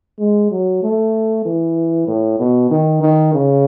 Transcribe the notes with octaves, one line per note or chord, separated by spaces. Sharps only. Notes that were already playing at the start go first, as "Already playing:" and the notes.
G#3
F#3
A3
E3
A2
B2
D#3
D#3
C#3